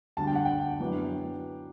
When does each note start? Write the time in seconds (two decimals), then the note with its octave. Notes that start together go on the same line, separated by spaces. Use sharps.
0.17 D2 D3 G3 D4 A5
0.27 G5
0.35 F#5
0.45 G5
0.80 F#2 E3 B3 D4